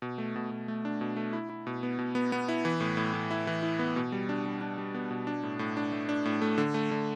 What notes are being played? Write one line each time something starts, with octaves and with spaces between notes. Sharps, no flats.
B2
A3
B2
B2
A3
D4
B2
A3
E4
E4
B2
B3
B2
B3
B3
E4
E3
A2
A2
A2
E4
E3
E4
B3
B2
G3
D4
G3
D4
G3
B3
B2
D4
A2
A2
D4
A3
D4
A2
A3
D3
A3
D3